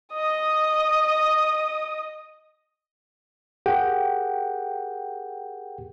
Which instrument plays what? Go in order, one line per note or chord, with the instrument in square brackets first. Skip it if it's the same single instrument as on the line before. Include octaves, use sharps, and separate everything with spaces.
[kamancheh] D#5 D#6
[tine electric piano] G4 G#4 A#4 F#5 G5